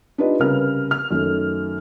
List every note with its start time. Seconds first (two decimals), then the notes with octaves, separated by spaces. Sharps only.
0.18 D4 D#4 F4 G4 B4 D#5
0.39 C2 C#3 A#4 B4 F6
0.91 F6
1.11 F#2 D#3 A3